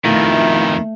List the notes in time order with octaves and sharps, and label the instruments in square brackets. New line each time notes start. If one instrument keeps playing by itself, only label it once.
[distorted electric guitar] F2 B2 [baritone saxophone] D#3 [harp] A3 [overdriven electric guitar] E4 F4